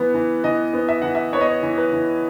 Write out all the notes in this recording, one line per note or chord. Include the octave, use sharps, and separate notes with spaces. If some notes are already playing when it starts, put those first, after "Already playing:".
Already playing: E3 B3
E3
E3 D#5
B3
E5
E3 F#5
E5
B3 C#5
D#5
C#5
E3
B4
E3